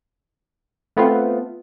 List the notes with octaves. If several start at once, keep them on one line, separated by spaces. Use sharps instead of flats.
A3 B3 C4 F4